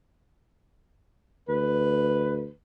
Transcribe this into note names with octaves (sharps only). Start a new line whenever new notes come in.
D2 B4